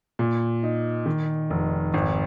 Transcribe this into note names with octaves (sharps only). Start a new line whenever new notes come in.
A#2
D#4
D#3
F1
G#1